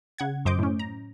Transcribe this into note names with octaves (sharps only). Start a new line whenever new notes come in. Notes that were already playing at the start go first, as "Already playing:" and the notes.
C#3 F#5 G#6
F#2 C5 D#5 D6 G6
A2 C#4
A#5